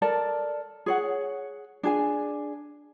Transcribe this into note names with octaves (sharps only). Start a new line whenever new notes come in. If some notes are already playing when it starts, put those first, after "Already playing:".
A4 A#4 D5 A5
G#4 C#5 F#5
D4 G#4 G#5